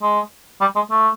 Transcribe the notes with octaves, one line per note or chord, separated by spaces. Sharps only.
G#3
G3
G#3
A3